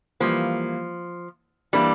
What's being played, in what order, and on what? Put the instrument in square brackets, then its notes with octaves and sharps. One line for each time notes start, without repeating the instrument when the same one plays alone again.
[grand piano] E3 G3 A#3 [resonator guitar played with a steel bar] F3
[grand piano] E3 A#3 D4 [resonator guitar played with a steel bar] G3